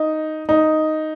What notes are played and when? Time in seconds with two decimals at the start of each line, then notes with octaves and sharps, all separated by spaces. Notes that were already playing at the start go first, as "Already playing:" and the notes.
Already playing: D#4
0.49 D#4